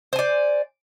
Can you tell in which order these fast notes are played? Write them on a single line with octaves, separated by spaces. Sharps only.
C5 G#5 D5